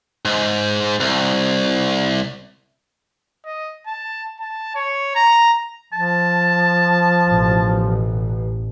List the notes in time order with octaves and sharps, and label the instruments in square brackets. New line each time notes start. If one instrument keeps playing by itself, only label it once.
[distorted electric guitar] G#2
C2
[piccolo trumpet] D#5
A5
A5
C#5
A#5
[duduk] F3 [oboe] A5
[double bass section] A1 B2